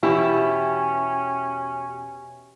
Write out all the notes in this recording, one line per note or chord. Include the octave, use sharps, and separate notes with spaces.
E2 B2 C#4 E4 G4